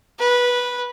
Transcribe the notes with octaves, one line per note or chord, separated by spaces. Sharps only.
B4